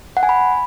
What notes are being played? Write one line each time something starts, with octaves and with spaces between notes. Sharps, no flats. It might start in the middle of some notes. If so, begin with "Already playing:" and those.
F#5
G#5
B5